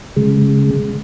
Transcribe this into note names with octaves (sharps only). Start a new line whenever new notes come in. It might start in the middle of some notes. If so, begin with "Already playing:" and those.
C#3 G#3